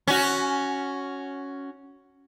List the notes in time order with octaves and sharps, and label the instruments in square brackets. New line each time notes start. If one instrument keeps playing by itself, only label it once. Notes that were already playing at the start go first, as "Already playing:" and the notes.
[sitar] C#4 F#4